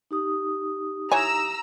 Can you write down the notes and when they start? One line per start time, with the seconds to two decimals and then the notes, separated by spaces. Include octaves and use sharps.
0.11 D#4 G4 D#6
1.12 E3 C#5 G#5 A#5 E6